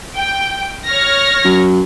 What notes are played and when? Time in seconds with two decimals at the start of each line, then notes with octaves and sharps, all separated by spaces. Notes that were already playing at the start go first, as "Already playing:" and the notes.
0.15 G5
0.86 C#5 F6 A#6
1.45 F#2